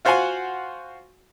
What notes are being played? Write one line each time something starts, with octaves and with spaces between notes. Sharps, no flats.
F4 F#4 C5 F5 F#5 G#5